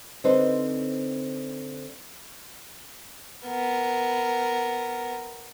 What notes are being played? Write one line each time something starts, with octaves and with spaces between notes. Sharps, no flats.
D3 C4 D#4 B4 C5
B3 A#4